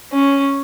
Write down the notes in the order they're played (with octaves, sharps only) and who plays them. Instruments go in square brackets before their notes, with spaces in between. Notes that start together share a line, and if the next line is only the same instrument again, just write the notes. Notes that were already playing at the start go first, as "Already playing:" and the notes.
[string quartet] C#4